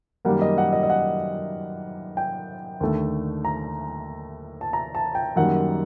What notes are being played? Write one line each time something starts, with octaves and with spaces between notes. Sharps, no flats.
F#2 D#3 G3 A#3 F#5
D#5
F#5
D#5
D#5
F#5
G5
D#2 D3 A3
A#5
A5
A#5
A5
G5
F#2 D#3 G3 A#3 F#5